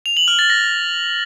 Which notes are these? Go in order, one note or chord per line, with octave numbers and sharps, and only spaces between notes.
F7
F#7
F6
A6
A#6